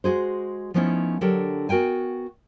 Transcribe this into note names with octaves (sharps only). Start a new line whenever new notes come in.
G#3 F#4 G#4 C5
F3 A3 B3 C#4 D#4 E4
D3 F#3 D4 G4 A4 A#4
B3 F#4 A#4 G5 G#5